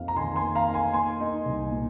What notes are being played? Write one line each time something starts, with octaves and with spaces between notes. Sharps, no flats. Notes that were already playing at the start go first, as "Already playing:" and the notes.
Already playing: F2 A#3 D#4 F5
A#5
D#3 G#5 C6
G#5 C6
A#3
F5 A#5
D#4
G#5 C6
A#3 G#5 C6
D#4
C2
A#2